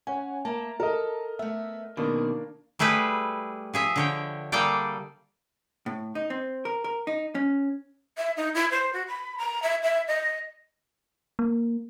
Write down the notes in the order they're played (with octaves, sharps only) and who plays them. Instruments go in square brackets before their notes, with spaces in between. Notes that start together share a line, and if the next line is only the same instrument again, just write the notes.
[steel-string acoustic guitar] C#4 [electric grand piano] C#5 F#5 G#5
[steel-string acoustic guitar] A#3 E5 [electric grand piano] A5 A#5
[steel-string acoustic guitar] A4 [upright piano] A#4 D#5
[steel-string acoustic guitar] A3 B3 [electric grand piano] E5
[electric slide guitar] B2 D#3 [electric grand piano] A#3 D4 A#4 [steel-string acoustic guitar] G#4
[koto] G3 A3 E4 G#4 B4
F3 G#4 E5
D3 C#5 G5
G3 A#3 G#4 A4 D5 G5
[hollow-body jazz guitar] A2
D#4
C4
A#4
A#4
D#4
C#4
[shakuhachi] E5
D#4
E4
C5
F#4
B5
A#5
E5
E5
D#5
[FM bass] A#3